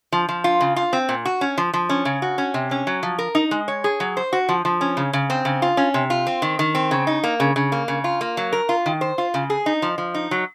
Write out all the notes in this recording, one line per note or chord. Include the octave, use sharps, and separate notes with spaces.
F3
F3
F4
C#3
F4
C4
A#2
F#4
C#4
F3
F3
C#4
C#3
F#4
C#4
C3
C#4
F#3
F3
A#4
D#4
G#3
C#5
G#4
F#3
C5
F#4
F3
F3
C#4
C#3
C#3
C4
C#3
F4
C#4
C3
F4
C4
D#3
D#3
C4
C#3
D#4
A#3
C#3
C#3
A#3
C#3
F4
A#3
F#3
A#4
F4
D#3
C5
F4
C#3
G#4
D#4
F3
F3
D#4
F#3